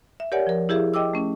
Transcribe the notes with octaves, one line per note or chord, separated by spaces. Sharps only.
E5
G4 A#4 C#5 D5 F#5 G#5
F3 A#4
E4 G4 G#4 E5 F5
D#5 G5 D6 E6
A3 C#4